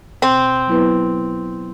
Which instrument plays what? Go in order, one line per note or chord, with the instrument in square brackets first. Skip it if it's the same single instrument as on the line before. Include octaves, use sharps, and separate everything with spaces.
[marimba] B2 [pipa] C4
[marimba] F#3 B3 E4 B4